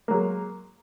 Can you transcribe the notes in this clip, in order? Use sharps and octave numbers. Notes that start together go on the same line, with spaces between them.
F#3 G#3 A#3